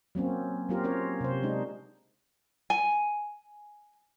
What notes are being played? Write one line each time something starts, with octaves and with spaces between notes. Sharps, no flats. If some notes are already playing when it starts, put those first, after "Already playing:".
F#3 A#3 C4 C#4
F#3 A#3 C4 F4 G4 A#4
C4 C#4 F4 A#4 C#5
C3 C5
G#3 D4 D#4
G#5